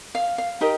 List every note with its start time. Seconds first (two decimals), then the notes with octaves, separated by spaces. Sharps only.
0.15 F5
0.38 F5
0.61 D#4 G4 A#4 D#5